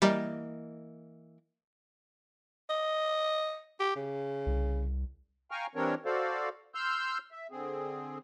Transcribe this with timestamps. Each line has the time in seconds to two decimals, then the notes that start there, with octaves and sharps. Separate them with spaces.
0.02 E3 G3 A#3 D#5
2.70 D#5
3.80 G4
3.96 C#3
4.46 C2
5.51 F5 G5 G#5 A#5 C#6 F6
5.75 E3 G3 C4 D4 A#4 C#5
6.05 F#4 A4 C5 D5 F5
6.75 C6 E6 F6 G6
7.32 E5
7.51 D3 C4 G#4